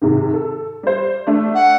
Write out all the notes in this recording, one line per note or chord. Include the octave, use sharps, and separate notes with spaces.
G#2 C3 D#3
A4
G3 C5
A3 D4
F#5